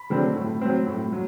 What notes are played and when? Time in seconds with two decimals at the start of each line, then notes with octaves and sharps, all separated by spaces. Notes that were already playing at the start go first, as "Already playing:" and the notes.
Already playing: B5
0.10 D3 F#3 C4
0.36 A2
0.61 F#3 C4
0.87 A2
1.12 F#3